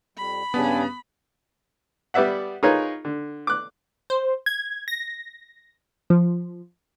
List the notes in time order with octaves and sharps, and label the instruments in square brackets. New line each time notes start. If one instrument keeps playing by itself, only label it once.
[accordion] F2 G3 [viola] B5
[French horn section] G2 C#3 [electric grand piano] B3 [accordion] D4 G#5
[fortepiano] G3 B3 D5 E5 F#5
D#4 F4 G#4 A#4 B4 C#5
D3
D6 F#6
[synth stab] C5
G#6
A#6
F3